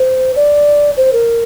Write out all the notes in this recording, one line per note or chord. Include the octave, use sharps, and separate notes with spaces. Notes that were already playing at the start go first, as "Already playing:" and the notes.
Already playing: C5
D5
C5
A#4